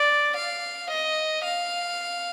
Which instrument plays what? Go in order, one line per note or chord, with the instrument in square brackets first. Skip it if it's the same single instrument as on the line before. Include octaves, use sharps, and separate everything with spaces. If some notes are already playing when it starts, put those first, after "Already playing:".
Already playing: [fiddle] D5
F5
D#5
F5